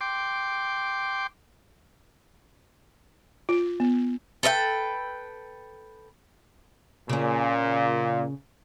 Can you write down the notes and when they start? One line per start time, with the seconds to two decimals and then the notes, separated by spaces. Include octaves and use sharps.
0.01 G5 C6 D6
3.49 F4
3.80 B3
4.43 A4 B4 E5 G5
7.09 A#2 C#3 C#4